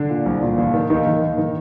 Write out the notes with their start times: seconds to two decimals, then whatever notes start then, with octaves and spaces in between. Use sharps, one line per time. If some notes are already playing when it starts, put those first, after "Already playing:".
Already playing: D3 D4
0.10 A#2
0.26 C2
0.42 A#2
0.58 D#2
0.74 D#3
0.90 D#2 D#3 D#4
1.06 D#3
1.22 D#2
1.38 D#3